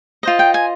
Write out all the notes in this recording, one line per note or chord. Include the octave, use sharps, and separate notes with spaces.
F4 C5 D#5
G5
G#5